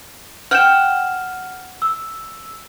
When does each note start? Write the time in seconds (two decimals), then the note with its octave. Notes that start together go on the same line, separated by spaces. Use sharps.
0.51 F#5 G5 F6 G6 E7
1.82 E6